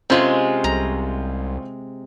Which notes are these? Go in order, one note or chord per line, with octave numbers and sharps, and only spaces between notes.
C3 G#3 C4 C#4 F4
C2 A#5